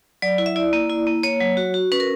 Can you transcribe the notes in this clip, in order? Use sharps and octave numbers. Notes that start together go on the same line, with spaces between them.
F#3 D5
E4
E5
E4 D5
A#3
E4
A#3
A#3 C#5
F#3
F#4
F#4
C#4 B4
A#4